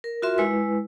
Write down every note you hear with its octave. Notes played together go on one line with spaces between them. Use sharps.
A#4
F4 F#4 A#4 E5 C6
G#3 E4 B4